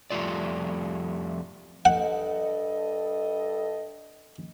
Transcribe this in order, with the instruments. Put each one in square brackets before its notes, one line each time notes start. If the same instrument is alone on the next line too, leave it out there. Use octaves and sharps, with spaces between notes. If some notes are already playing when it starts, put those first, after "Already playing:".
[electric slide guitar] F2 G3 A3 F4 D5
[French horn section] G2 A4 D#5 [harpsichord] F#5